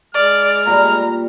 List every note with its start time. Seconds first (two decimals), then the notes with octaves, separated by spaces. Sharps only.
0.15 G#3 D5 F6
0.66 A#2 G3 A#5